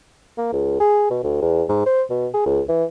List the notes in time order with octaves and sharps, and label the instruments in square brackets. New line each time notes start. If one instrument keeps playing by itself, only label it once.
[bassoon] A#3
C#2
G#4
B2
D2
E2
G#2
C5
B2
G#4
C#2
E3